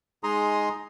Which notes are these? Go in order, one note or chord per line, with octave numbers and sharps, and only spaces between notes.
G#3 D#4 G#4 A#5 C6 D#6